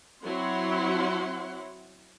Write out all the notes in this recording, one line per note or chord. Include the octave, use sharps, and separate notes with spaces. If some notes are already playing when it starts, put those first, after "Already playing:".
F#3 C4 E4 C#5 F#5 C6